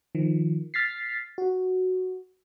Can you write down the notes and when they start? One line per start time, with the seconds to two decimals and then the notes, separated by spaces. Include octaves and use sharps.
0.15 D#3 F3
0.74 F6 A6 B6 C7
1.38 F#4